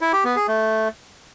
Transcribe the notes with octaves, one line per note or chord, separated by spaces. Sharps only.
E4
G4
B3
G#4
A3